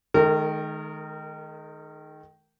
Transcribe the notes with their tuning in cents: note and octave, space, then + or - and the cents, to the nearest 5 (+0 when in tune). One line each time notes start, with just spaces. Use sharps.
D#3 +0 G#3 +45 A#4 -30